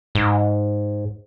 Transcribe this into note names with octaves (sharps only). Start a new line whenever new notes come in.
G#2